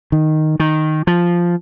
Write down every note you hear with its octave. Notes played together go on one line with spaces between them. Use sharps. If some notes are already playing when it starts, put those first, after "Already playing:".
D#3
D#3
F3